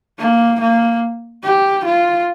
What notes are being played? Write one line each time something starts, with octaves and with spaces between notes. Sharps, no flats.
A#3
A#3
G4
F4